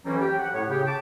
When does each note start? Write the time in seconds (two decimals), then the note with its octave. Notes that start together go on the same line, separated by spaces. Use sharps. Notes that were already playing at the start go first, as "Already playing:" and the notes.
0.05 F2 E3 F#3 G3 A#3 C#4
0.20 G4
0.40 F#5
0.53 A2 C#5
0.69 C#3 G4
0.87 A5 D6